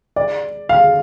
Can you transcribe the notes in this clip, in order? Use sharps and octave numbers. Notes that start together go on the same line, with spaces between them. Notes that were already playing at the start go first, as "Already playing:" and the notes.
D5
F5